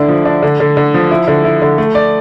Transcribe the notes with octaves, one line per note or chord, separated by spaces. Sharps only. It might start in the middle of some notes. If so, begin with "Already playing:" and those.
Already playing: D3 D4 E4
F3
D4
D3
D3
D3
F3
E4
D3
E4
D3
A3
D5